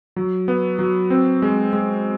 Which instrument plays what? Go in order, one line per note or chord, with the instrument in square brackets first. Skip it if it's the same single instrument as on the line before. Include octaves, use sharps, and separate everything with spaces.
[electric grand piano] F#3
B3
F#3
C4
G#3
G#3